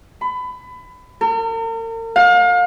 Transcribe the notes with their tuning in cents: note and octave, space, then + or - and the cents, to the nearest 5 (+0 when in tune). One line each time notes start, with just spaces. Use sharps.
B5 +25
A#4 -40
F5 +35